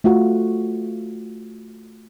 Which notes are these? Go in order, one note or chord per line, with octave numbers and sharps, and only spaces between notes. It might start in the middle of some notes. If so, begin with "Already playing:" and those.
A3 F4 F#4